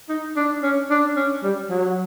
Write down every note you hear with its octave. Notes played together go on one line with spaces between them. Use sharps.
D#4
D4
C#4
D4
C#4
G3
F#3